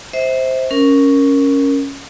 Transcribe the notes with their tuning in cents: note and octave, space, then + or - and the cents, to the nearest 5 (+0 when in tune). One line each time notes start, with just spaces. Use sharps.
C5 +0 E5 -30
C#4 +0 A#4 +0